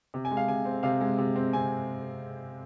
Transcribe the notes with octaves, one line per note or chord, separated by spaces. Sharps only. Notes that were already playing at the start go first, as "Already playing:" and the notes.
C3
G#5
G#3
F5
C3 G#5
C4
C3 F5
G#3
C3
C4
C3 G#5